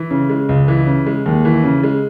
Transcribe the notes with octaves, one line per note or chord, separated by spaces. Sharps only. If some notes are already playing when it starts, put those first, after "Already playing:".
Already playing: E3
C#3
G#3
C#2
E3
C#3
G#3
D#2
E3
C#3
G#3